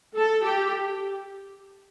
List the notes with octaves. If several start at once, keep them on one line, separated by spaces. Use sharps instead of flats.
A4
G4